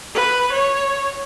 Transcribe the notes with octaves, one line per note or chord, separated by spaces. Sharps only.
B4
C#5